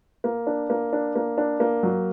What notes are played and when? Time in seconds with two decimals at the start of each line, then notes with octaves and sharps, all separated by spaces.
0.24 A#3
0.47 D4
0.70 A#3
0.93 D4
1.16 A#3
1.38 D4
1.60 A#3
1.83 F#3